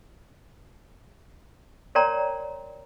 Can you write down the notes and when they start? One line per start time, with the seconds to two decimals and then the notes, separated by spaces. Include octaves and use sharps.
1.95 A#4 C#5 D5 G5 A#5 C6